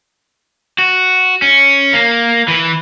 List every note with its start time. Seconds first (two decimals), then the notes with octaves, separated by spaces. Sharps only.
0.78 F#4
1.42 C#4
1.93 A#3
2.48 E3